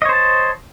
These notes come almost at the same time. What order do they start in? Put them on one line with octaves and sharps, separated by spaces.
D#5 C#5 C5 A5